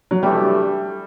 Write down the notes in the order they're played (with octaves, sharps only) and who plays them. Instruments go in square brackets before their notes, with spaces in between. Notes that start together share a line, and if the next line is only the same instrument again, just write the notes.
[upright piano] F#3
[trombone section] E3 A3 D4 G4 [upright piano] G3